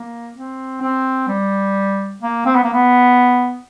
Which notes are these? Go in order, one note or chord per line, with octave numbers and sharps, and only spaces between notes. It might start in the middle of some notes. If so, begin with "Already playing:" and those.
Already playing: A#3
C4
C4
G3
A#3
C4
B3
A#3
B3